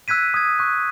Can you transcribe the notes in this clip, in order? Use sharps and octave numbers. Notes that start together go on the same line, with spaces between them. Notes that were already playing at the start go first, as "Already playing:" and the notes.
E6 F#6 G#6 B6 D#7
D#6 G#6
C#6 F#6